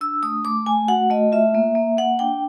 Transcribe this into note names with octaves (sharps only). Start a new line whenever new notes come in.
D4 E6
A3 D#6
A3 D6
A3 G#5
F#4 F#5
A3 D#5
F4 E5
A#3
A#3
A#3 F#5
D4 G5